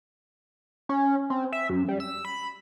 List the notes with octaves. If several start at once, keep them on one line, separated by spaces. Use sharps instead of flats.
C#4
C4
E5
F#2
G3
E6
B5